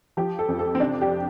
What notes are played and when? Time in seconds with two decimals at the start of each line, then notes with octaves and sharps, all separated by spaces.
0.17 F3 G4
0.39 A4
0.48 F2
0.59 A4
0.75 C4
0.80 C3 D4
1.01 G4